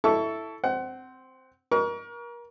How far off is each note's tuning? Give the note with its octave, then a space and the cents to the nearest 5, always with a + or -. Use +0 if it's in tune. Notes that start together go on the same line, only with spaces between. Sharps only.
E4 +0 A4 +0 C#6 +25
C4 -5 F#5 +30
A#4 +30 C#6 +40